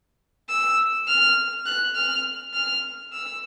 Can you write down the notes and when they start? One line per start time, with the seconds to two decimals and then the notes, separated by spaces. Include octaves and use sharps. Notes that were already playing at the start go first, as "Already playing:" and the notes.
0.49 E6
1.08 F6
1.66 F#6
1.95 F6
2.54 F6
3.13 E6